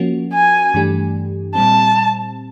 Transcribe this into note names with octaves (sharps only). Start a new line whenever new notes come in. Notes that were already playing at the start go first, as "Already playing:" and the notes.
Already playing: F3 A#3 C#4 F#4
G#5
G2 E3 A3 D4 G4
A#2 G3 C4 A5